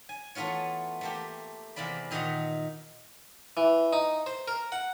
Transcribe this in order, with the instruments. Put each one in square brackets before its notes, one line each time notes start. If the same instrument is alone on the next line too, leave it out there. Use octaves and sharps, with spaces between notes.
[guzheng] G#5
E3 A3 B3 F4 C#5
A3 A#3 G4
E2 C3 A#3 D5 B5
A#2 D#3 D#4 E5 F#5 A#5
[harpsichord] E3
D#4
C5
A#4
F#5